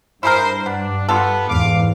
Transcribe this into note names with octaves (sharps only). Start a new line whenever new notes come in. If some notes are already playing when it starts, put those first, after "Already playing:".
G2 E4 G#4 A#4 C5
B3 D4
B3 F4 G4 A4
E2 G#2 F5 D6